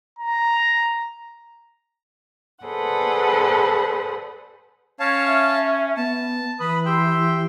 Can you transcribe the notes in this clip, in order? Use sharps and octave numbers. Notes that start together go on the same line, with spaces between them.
A#5
G#4 A4 B4 C5 D5 F#5
C#4 C#5 F5 A5
E5
B3 A5
E3 B4 B5 D#6
G4 G5 C6 E6